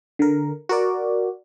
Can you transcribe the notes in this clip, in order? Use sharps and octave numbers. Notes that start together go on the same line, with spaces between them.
D3 A#4
F#4 A#4 D5